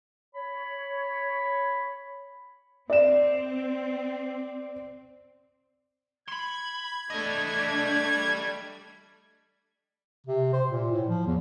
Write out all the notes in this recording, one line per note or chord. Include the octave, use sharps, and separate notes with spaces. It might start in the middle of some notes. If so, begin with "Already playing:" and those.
C#5 B5
C4 D5 E7
B5 C6 G#6
G3 A3 D4 D#5
C3
C5
A#2
A2
F3
E2